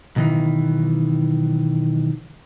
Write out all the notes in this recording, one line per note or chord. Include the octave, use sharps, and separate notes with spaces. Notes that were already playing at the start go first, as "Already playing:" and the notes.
B1 D#3 E3